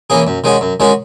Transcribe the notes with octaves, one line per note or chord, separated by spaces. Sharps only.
E3 A#3 C#4 G#4
F#2
D#3 G#3 C#4 F#4
F#2
D#3 G#3 C#4 F#4